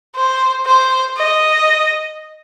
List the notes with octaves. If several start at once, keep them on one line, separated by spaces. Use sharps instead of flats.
C5
C5
D#5